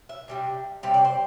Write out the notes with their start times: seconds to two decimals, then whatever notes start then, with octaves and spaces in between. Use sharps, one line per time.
0.09 E5
0.28 C3 G3 D4
0.83 C3 G3 C4 E5
0.94 D5
1.05 C5